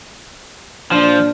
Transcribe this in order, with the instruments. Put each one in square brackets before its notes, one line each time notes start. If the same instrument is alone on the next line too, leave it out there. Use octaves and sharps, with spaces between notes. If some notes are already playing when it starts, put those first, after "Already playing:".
[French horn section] A#2 D4 [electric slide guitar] F3